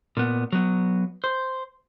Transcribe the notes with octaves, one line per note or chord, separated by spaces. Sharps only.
A#2 B3
F#3 B3
C5